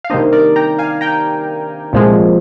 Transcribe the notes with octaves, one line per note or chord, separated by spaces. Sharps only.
F5
C3 D#3 G3 A#3 D4 C5 D#5
A#4 D5
G5 A#5
F5 G#5
G5 A#5
C2 A#2 F3 G#3